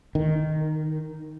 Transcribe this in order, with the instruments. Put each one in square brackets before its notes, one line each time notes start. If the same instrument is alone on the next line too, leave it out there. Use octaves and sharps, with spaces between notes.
[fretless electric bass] D#3